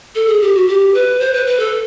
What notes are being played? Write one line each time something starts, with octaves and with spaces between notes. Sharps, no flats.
A4
G#4
G4
F#4
G4
B4
C5
B4
B4
A4